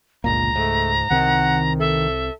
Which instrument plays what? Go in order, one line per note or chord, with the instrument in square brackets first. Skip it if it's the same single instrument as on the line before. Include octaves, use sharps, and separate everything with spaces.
[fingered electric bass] G1 A#2 A#3 [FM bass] C#2 [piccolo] A#5
[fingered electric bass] G#2 [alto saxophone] A3
[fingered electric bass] C2 C3 C4 [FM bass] D#3 [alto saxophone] F#5
[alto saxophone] A4 [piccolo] E5